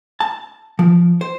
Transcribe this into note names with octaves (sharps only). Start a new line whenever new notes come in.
A5
F3
C5